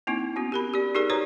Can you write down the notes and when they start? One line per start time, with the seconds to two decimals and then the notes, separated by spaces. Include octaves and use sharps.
0.07 A#3 C4 D#4 E4
0.36 B3 C#4 F#4
0.52 G4 A#4 B5
0.74 G4 D5
0.95 D#4 G4 G#4 A#4 D5
1.09 D#4 F#4 B4 C#5 D5 A#5